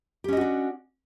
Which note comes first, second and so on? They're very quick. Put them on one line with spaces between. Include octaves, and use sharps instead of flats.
G4 C#4 D#5 F#4 D4